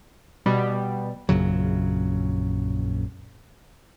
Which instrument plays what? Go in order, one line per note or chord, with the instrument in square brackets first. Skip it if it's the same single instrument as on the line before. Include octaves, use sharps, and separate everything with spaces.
[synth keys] B2 G3
[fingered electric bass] A#1 F#2 C#3 F#3